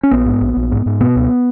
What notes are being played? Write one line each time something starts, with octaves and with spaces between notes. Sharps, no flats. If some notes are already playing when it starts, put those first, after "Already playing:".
C#4
A#1 B3
G#2
A#1
A#1
G#2
G#2
B2 B3
C#2